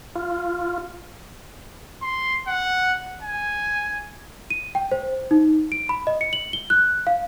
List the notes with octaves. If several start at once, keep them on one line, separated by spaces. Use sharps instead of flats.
F4
C6
F#5
G#5
D#7
G5
C5
D#4
D7
B5
D#5
C#7
F#7
G7
F#6
F5